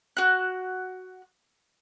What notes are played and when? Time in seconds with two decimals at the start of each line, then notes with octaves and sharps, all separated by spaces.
0.17 F#4 F#6